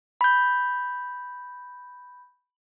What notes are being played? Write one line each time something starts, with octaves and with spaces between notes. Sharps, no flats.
B5 G6